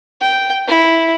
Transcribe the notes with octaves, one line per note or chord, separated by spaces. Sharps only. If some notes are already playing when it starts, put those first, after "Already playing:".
G5
E4